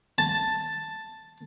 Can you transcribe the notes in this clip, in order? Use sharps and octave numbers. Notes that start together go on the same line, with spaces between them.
A5